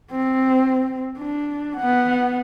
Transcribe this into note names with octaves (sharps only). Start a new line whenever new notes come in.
C4
D4
B3 F#5